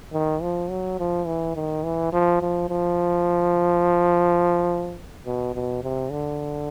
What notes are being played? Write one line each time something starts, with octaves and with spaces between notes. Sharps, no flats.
D#3
F3
F#3
F3
E3
D#3
E3
F3
F3
F3
B2
B2
C3
D3